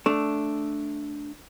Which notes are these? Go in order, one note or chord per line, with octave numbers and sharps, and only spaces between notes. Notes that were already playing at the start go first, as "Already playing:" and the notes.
A3 D4